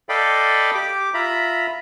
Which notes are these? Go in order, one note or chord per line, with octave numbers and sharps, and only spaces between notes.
A4 D5 D#5 F5 G5 B5
G4 D6
F4 E5 A#5 B5